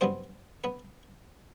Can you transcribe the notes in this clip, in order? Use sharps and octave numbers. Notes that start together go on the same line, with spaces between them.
G2 F#3 B3 C4 C5
B3 B4